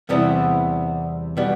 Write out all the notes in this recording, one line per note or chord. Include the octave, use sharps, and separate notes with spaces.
E2 C3 G3 B3 E4
B2 G3 B3